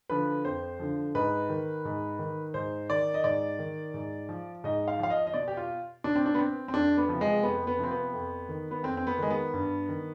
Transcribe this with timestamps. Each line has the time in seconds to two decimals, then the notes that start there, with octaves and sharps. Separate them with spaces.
0.10 D3 F3 B4
0.45 F2 C5
0.79 D3 F3
1.15 G#2 B4
1.49 D#3
1.85 G#2
2.19 D#3
2.54 G#2 C5
2.90 D#3 D5
3.14 D#5
3.24 G#2 D5
3.59 D#3
3.94 G#2
4.29 F3
4.64 G#2 D#5
4.88 F5
4.99 F3 F5
5.10 D#5
5.27 D#5
5.34 B2 D5
5.48 G4
5.57 F4
6.04 B2 D4
6.16 C4
6.26 D4
6.34 B3
6.39 C4
6.68 C4
6.73 F2 D4
6.97 B3
7.09 C3 F3
7.21 G#3
7.43 F2 B3
7.67 B3
7.79 C3 F3 C4
7.91 B3
8.13 F2
8.49 D#3
8.71 B3
8.83 F2 C4
8.97 C4
9.07 B3
9.18 D#3 G#3
9.30 B3
9.54 G2
9.89 D#3